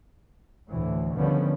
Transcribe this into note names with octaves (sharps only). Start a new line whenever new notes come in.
D2 A2 E3
D3 D#3 F3 G3 B3 C#4